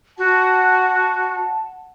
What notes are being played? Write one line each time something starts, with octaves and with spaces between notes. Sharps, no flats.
F#4 F#5 A5